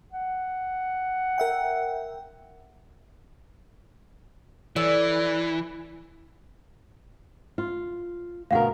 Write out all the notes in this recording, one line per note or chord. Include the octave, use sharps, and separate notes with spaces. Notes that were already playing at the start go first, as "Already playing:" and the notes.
F#5
A#4 E5 G5
E3 A4 C#5 D5
F4
D2 B2 A#4 F5 F#5